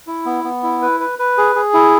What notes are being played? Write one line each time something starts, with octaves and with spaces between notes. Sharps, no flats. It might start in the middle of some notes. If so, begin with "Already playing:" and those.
E4
B3
B3
E4
B4
B4
B4
G#4
G#4
E4